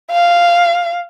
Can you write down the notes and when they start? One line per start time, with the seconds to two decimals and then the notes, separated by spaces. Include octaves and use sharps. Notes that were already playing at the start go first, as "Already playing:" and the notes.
0.12 F5